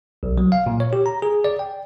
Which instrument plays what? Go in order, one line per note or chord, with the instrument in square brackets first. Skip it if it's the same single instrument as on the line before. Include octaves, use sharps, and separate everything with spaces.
[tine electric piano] B1
F#3
F5
A#2
C#5
G4
A#5
G#4
D5
G5